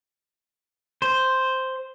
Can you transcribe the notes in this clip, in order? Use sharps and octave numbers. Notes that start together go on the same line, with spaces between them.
C5